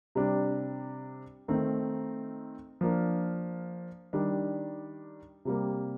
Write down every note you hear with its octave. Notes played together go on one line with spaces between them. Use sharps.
C3 G3 D4
D#3 A3 C4 D#4
F3 A#3 D4
D#3 G3 D4
C3 G3 A#3